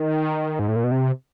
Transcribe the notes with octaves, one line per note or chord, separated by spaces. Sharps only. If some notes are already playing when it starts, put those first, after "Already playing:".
Already playing: D#3
G#2
A2
A#2
B2
C3